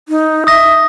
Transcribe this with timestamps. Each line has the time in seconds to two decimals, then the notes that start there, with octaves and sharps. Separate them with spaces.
0.09 D#4
0.47 E5 D#6 A#6